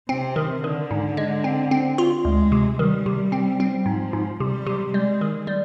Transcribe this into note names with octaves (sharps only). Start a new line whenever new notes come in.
C3 C4
D#3
D3 D#3
G#2
G#3
C4
C4
F4
D2 G#3
C3
D#3 G3
C3
C4
C4
G#2 F3
G#2
C3 G3
C3
G3 G#3
D#3
G3